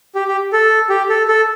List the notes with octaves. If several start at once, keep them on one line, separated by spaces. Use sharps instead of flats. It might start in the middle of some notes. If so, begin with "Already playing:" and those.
G4
G4
A4
G4
A4
A4